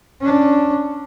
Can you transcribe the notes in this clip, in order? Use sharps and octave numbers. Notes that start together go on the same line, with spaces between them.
C#4 D4